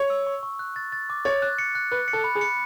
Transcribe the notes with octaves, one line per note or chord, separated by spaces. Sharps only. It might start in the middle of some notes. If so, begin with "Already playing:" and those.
Already playing: C#5
E6
C#6
C#6
F#6
A6
A6
D6
C#5 A6
F#6
C#7
F#6
B4 F#6
C#7
A4
B5
G#4
C#7